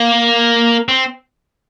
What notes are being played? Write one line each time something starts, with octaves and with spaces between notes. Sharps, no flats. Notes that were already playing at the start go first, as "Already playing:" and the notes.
Already playing: A#3
C4